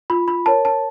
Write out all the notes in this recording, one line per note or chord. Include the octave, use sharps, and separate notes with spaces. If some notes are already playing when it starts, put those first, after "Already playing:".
F4 B5
B5
A#4 C#5 A5
A5